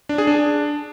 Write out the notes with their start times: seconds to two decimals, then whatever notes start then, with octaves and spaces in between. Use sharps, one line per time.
0.09 D4
0.18 G#4
0.27 D4